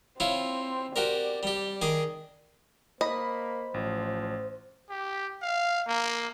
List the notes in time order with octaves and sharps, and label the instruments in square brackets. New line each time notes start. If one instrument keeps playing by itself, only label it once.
[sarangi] C4 [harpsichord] E4 F4 C#5
[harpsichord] F#4 G4 A#4 [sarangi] D5
[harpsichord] G3 G4
D#3 G#4 D6
[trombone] A#3 [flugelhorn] C5 [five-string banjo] D#5 [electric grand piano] B5
[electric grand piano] A1 [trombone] F3
[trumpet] G4
F5
A#3